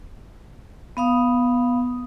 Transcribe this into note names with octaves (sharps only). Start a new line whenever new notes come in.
B3 F5 D#6